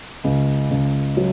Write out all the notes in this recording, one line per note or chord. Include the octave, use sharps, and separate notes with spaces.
C#2
C#2
F#3